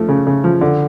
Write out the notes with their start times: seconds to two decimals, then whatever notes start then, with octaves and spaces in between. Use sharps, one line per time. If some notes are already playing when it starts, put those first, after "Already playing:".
Already playing: F3 A3
0.09 C#3
0.27 C#3
0.44 F3
0.61 D3